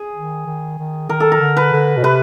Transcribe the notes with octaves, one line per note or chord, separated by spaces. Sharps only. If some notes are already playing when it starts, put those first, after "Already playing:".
Already playing: G#4
D#3
D#3
D#3
D#3 A#4
A4
A#4
D3
B4
D3
B2
C3 B4